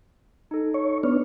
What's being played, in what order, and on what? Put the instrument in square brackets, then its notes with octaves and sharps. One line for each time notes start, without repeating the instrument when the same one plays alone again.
[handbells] D#4 A4
[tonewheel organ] C#5
[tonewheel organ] B3 D4 [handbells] F6